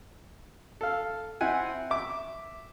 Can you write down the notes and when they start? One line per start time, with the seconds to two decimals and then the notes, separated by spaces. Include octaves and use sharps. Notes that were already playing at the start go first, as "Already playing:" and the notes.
0.81 A4 F5
1.41 C4 E4 F#5 G#5
1.91 E5 D6